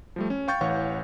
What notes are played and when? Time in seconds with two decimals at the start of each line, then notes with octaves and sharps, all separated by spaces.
0.16 F3 G3 A3
0.30 C#4
0.48 F5 G5 C#6 G6 A6
0.61 A1 E3 C#5 F5 F#5 C#6